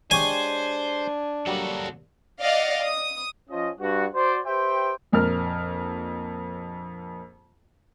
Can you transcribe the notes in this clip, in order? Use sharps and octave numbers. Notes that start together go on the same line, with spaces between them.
G#3 D4 G4 C5 C#5 G#5
F#3 G3 A#3 F#4 A4
D5 D#5 F5 F#5
D#6
F3 C#4 D#5
G2 F#4
F#4 C5 D5
G4 B4 C5 E5 G5
A#1 F2 A#4 F6